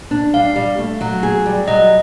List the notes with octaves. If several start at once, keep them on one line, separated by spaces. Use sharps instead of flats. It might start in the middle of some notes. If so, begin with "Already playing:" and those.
D4
G3 F5
G3
A3
F#3
G#4
G3
F#3 D#5